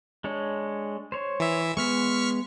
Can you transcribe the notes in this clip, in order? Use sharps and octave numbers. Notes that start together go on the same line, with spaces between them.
G#3 D4 C#5
C5 C#5
E3 E5
G#3 B3 C#6 F6 B6